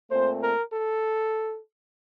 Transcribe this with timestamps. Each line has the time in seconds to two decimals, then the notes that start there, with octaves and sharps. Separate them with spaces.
0.10 A#2 A3 C4 C5
0.41 A#4
0.72 A4